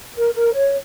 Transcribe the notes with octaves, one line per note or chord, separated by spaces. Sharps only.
A#4
A#4
C#5